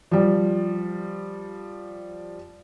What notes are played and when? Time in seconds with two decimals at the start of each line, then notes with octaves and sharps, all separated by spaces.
0.11 F3 G3